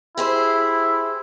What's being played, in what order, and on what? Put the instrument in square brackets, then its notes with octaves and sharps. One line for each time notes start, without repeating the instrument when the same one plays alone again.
[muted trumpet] E4 [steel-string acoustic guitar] G4 G#4 C5